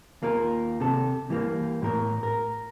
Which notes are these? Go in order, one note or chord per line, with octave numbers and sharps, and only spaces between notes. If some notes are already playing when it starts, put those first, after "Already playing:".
D#2 A#3 F4 A#4
C3 A4
E3 G3 A#3
A2 A#4
A#4